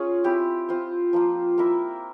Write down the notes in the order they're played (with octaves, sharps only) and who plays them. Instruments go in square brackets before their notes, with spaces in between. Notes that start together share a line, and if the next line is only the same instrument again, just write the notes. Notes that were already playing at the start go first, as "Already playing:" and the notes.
Already playing: [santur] C#4 F4 G#4
C4 E4 G4
C4 F4 C5
F3 A#3 F4
A#3 E4 A#4 E5